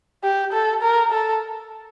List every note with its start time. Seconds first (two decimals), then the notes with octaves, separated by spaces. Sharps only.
0.24 G4
0.53 A4
0.82 A#4
1.11 A4